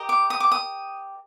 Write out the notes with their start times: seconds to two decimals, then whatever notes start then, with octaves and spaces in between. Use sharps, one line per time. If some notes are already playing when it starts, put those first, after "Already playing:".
Already playing: G4 A#4 D#5
0.09 D6
0.30 D#6
0.40 D6
0.52 D#6